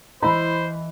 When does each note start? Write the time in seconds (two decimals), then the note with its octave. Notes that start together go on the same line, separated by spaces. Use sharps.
0.23 E3 E4 C5 D#5 B5